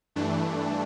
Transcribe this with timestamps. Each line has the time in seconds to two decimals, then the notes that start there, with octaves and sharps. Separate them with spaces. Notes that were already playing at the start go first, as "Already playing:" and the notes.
0.16 G2 E3 A3 D4